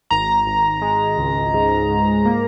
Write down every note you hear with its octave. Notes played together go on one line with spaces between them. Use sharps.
G#1 A#5
G#1
G#3
C#2
G#2
G#2
A#3